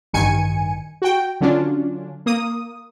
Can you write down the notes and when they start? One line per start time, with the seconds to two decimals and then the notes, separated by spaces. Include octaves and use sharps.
0.13 A1 G2 D#3 G#5 C#7 D#7
1.02 F#4 G5
1.41 D3 F#3 C#4 D4 F4
2.26 A#3 D#6